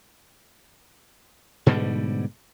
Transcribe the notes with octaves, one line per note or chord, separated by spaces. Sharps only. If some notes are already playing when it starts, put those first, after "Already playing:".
G#2 B2 D3 G3